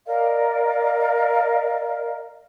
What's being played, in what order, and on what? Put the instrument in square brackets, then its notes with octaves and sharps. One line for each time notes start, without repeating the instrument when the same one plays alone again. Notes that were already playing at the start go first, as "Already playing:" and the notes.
[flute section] A#4 D5 D#5 F5